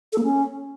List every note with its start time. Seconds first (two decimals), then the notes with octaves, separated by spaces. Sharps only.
0.13 A4
0.18 A#3
0.24 C#4